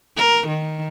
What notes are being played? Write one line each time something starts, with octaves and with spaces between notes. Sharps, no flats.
A#4
D#3